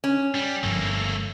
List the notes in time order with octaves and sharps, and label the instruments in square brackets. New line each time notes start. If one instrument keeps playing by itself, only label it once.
[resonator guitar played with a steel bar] C#4
[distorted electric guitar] G3
[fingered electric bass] G1 G2 F3 [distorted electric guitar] A3 A#3